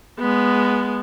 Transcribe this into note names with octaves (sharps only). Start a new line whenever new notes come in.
G#3 B3